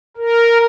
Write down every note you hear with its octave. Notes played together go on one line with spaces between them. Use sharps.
A#4